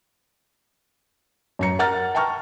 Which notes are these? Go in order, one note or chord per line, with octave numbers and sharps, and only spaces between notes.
F#2 A#5 C#7
A#4 F#5 A#5 F6 A6
G5 A5 A#5 C#6 F6